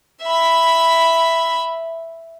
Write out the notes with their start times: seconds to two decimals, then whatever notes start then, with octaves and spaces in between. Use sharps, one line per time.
0.23 E5 B5